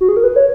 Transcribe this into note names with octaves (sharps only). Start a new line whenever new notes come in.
F#4
G#4
A#4
B4
C#5